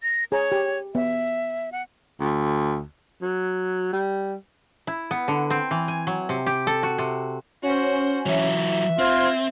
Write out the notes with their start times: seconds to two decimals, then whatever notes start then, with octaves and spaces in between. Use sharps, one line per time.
0.03 A#6
0.32 G#4 C#5 A#5
0.52 G4
0.95 B3 E5
1.72 F#5
2.20 D2
3.22 F#3
3.93 G3
4.87 E4
5.11 B3
5.28 D3
5.50 C4
5.71 E3
5.88 G#5
6.07 F#3
6.29 C3
6.46 G4
6.67 A4
6.83 F#4
6.98 C3
7.63 C#4 F#4 C5
8.26 E3 F#3 E5
8.99 C4 F4 C5 G#6